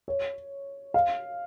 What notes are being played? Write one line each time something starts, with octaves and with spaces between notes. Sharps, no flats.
C#5
F5